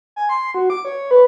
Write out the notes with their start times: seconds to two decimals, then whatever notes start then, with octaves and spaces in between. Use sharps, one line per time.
0.16 G#5
0.29 C6
0.54 F#4
0.70 D6
0.85 C#5
1.11 B4